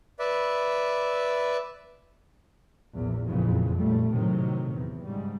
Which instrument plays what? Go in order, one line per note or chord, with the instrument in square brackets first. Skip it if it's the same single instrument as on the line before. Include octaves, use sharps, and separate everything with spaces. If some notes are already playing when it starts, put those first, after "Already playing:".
[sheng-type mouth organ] B4 D5 E5
[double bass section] A#1 E2
F#1 F2 A#2 C#3 E3
A#2 G3 A3
A2 C3 D#3 F#3
E2
G#2 C#3 G3